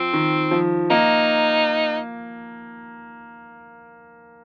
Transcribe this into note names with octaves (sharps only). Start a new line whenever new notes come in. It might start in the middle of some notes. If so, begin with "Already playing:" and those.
Already playing: F3 C4
D#3
F3
A#3 D#4